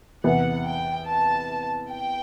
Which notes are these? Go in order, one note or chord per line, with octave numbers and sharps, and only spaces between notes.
E2 C3 E3 B3 F#5
G5
A5
G5